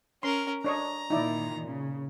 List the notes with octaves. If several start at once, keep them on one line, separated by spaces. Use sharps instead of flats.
C#4 A#4 C6
D4 C#5 D#5 A#5
A#2 D#3 D#4 E4 D5
C#3